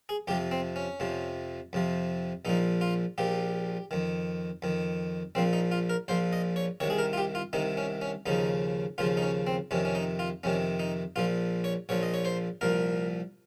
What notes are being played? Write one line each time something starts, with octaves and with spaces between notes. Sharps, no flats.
G#4
F2 C3 F3 G4
C4
C#4
F2 C3 F3
F2 C3 F3
A#1 A#2 F3 D#4
F4
A#1 A#2 F3 G4
F2 D#3
F2 D#3
A#1 A#2 F3 C4
D#4
F4
A#4
A#1 A#2 F3 C5
D#5
C#5
C2 C3 D#3 C#5
G#4
A#4
F4
G4
F4
C2 C3 D#3 D#4
C#4
C#4
D#2 C#3 F3 D#4
D#2 C#3 F3 F4
D#4
C#4
C4
F2 C3 D#3 C#4
C#4
D#4
F4
F2 C3 D#3 C#4
D#4
A#1 A#2 F3 F4
C#5
A#1 A#2 F3 C#5
D#5
C#5
C5
C2 A#2 F3 A#4